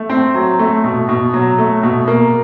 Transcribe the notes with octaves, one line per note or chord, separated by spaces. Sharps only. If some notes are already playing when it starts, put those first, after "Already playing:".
Already playing: A3
C4
F#3
A3
B2
B2
F#3
A3
B2
A#3